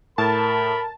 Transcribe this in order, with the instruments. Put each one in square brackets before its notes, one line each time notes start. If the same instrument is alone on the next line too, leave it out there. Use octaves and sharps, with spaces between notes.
[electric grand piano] A2 [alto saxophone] A#4 [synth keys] A5 [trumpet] B5